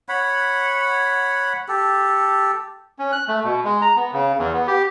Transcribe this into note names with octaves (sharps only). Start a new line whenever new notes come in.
C#5 F#5 B5
G4 A4
C#4
F#6
A3
B2
G#3
A#5
B3
C#3
E2
B3
G4